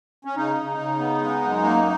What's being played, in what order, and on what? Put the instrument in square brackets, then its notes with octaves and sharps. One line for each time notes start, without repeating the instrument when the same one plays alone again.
[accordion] C#4
C#3 D#4
C#3
C#3
B3
G#3
F#2
A#3